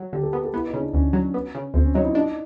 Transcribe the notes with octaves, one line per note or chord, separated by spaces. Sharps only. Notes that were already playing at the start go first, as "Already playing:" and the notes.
Already playing: F#3
D3 G4
A4
B3 A#4
A4
B3 E4
D#4
C#3
D4
D2 C#4
F#3
B3
C#3
D2 C4
C#4
F#3 D#4
E4
D4 D#4